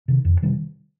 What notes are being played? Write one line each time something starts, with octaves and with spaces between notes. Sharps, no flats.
C3 D#3
F2
C3 D#3 G3